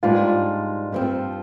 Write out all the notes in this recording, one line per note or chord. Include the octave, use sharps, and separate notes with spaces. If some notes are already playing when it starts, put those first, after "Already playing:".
G#2 G3 D4 F4
G2 F3 C4